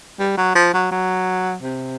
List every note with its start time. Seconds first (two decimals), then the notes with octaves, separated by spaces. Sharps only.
0.19 G3
0.37 F#3
0.55 F3
0.74 F#3
0.92 F#3
1.62 C3